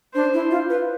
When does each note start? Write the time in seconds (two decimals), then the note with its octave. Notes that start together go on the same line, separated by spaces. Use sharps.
0.15 D4 C5
0.34 E4
0.51 F4
0.70 B4